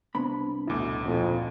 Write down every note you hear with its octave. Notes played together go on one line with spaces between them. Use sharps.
C2 B3 C4 D4 B5
A1 D2 B2 E4 D6
F2 A#2